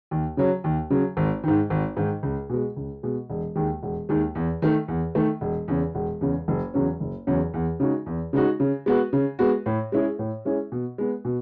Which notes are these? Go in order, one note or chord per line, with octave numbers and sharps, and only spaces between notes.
D#2
C#3 F#3
D#2
C#3 F#3
G#1
G#2 D#3
G#1
G#2 D#3
C#2
B2 G#3
C#2
B2 G#3
E1
D#2 D#3 G#3
E1
D#2 D#3 G#3
E2
D#3 A3
E2
D#3 A3
E1
E2 C#3
E1
E2 C#3
F#1
E2 C#3 F#3 C#4
F#1
E2 C#3 F#3 C#4
E2
C#3 G#3 D#4 F#4
E2
C#3 G#3 D#4 F#4
C#3
G#3 B3 F#4
C#3
G#3 B3 F#4
A2
G#3 C#4 E4 G#4
A2
G#3 C#4 E4 G#4
B2
G#3 B3
B2